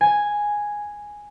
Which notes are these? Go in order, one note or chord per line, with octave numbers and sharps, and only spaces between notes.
G#5